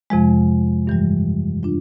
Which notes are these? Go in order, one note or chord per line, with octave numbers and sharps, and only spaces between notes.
F2 C3 F3 G#3
G2 E3 G3
D4 F4